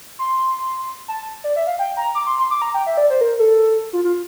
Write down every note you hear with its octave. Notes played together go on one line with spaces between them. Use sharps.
C6
A5
D5
E5
F5
G5
A#5
D6
C6
C6
D6
A#5
G5
E5
D5
C5
A#4
A4
F4
F4